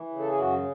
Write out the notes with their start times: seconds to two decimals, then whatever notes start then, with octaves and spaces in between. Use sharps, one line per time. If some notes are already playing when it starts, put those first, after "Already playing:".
Already playing: E3
0.09 C#3
0.19 A4
0.29 G#4
0.38 F#2 F#4